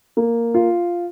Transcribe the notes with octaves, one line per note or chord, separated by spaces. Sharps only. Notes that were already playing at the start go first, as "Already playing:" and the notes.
A#3
F4